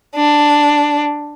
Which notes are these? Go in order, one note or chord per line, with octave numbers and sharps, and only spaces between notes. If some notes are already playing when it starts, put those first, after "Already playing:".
D4